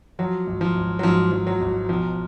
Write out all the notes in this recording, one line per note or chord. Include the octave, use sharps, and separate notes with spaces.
F3 F#3
G#1
F3
G#1
F#3
G#2 F3
F3
F#3
G#1
B1 F3